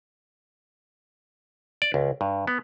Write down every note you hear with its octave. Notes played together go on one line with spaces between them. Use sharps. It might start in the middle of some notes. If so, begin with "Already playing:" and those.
D5
C#2
G2
B3